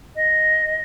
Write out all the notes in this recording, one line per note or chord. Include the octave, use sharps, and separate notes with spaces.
D#5